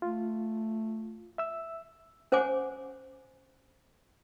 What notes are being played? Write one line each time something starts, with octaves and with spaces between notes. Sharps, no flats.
A3 F4
E5 E6
C#4 C5 F#5 G#5 D6